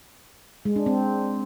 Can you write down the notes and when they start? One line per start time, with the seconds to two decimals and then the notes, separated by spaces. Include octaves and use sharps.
0.65 G#3
0.76 D4
0.86 C4